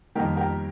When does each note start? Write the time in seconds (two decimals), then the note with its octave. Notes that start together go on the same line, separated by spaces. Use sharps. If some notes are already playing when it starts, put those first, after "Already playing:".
0.15 F2 D#3 G3 A#3 G4 A#4
0.37 G4 A#4